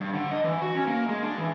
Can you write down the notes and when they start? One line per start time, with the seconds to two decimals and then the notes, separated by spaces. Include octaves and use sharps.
0.01 G2
0.14 D3
0.31 D#5
0.44 E3
0.62 F#4
0.75 C#4
0.88 A#3
1.09 G#3
1.23 D4
1.38 E3